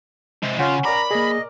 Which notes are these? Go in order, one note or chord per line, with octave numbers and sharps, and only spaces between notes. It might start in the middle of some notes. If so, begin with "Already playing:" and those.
C3 G#3
C#3 C#4 F4 C#5 F#5
A#4 D5 A#5 B5
A#3 G#4 D#5